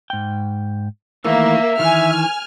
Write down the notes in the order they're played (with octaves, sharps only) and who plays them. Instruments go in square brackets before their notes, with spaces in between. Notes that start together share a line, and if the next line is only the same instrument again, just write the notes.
[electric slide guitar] G#2 G5
[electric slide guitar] D#3 E3 A3 [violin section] A#3 [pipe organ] E5
[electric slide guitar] D#3 E3 [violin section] G#5 F6